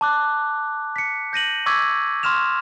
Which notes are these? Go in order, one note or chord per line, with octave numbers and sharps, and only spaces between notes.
A5 D6 F#6
B6 C#7
G6 A#6 D#7 F#7
C#6 D6 E6 G#6 B6 D#7
C6 C#6 F6 E7 F7